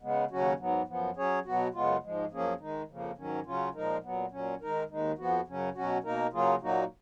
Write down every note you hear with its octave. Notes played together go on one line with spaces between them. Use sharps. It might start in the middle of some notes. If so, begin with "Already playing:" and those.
C#3 G#3 B3
D#2 C#3 F#3 C#4 F#4
G#2 F#3 B3
F#2 F3 B3
F#3 C#4 G#4 C#5
B2 F#3 B3 F#4
F#2 C#3 G#3 B3 F4
G#2 F3 G#3
F#2 F3 A#3 C#4 G#4
D#3 G#3 D#4
F2 C#3 F3 A#3
G#2 D#3 F#3 C#4
C#3 F#3 C#4 F4
A#2 F3 G#3 D#4 A#4
A#2 F#3 B3
A#2 F#3 C#4
D#3 G#3 D#4 A#4
D#2 D#3 G#3 D#4
F2 F3 B3 F#4
F#2 C#3 F#3 C#4
B2 F#3 C#4 F#4
B2 A#3 D#4 A#4
C#3 F#3 A#3 F4 G#4
A#2 F#3 A#3 D#4 F#4